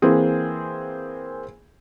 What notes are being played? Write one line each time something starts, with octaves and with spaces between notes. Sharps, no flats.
E3 A#3 C4 G#4